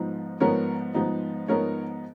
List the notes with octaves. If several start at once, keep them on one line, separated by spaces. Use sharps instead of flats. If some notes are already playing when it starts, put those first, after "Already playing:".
Already playing: G#2 F3 B3 D#4
G#2 F3 B3 D#4 A#4 C#5
G#2 F3 B3 D#4
G#2 F3 B3 D#4 A#4 C#5